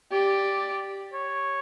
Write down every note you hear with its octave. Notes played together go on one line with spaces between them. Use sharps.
G4 D5
C#5